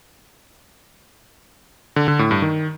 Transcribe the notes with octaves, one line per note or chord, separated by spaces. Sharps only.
D3
D3
A2
G2
D#3